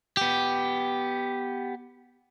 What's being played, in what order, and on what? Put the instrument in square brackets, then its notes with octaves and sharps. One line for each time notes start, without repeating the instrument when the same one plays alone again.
[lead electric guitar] B3 G4